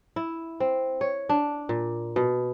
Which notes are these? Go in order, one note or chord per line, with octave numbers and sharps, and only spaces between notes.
E4
C4
C#5
D4
A#2
B2